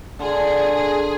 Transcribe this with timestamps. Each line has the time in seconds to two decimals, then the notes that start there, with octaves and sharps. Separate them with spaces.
0.19 D3 F4 G#4
0.77 G#4